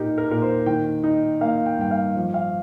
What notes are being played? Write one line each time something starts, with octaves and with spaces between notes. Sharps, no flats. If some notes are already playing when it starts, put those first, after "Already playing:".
Already playing: A#2 A#3 D#4 G4 A#4
A#4
A#2 A#4
C5
D#3 G5
D#4
A#3 F5
G5
G2 G5
F5
F3
F5